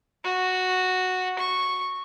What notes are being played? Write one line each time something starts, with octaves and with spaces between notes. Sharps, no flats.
F#4
C#6